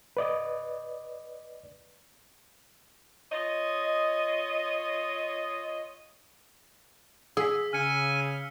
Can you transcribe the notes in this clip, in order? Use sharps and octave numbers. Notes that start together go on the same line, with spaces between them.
B4 D5 D#5
F4 C#5 D#5
G#4 E6 B6
C#3 F5 G#5 F6 C#7